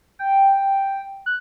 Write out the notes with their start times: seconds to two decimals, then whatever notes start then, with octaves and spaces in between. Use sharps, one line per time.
0.19 G5
1.26 F#6